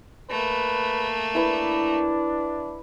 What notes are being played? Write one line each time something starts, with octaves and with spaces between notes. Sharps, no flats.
A3 A#3 B4
D4 E4 B4 B5